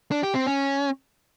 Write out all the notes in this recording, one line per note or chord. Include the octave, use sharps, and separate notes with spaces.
D4
G4
C4
C#4